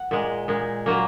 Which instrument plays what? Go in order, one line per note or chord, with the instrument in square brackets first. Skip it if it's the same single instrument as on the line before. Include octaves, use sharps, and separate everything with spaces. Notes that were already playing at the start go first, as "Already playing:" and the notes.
Already playing: [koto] F#5
A#2 G#3
A#2 G#3
A#2 F#3 A#3